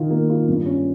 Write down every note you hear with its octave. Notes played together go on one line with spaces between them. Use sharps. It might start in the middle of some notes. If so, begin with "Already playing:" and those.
Already playing: D#3 F4
A#3
F4
G2
C#4